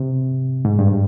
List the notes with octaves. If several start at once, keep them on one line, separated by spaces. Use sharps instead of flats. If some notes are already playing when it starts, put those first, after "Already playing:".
Already playing: C3
G#2
G2